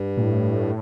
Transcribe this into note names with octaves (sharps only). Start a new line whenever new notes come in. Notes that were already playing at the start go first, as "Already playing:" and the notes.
Already playing: G2
A#2
A2